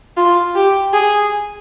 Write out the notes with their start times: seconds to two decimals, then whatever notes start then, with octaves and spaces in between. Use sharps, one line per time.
0.17 F4
0.56 G4
0.93 G#4